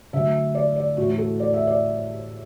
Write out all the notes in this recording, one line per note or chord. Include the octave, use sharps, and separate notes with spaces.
D3 F#3 A3 E5
D5
D5
A2 E3 A3 F#4
F#4
A4
D5
E5
D5